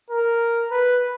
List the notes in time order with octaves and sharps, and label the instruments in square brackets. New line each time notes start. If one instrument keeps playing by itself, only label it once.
[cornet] A#4
B4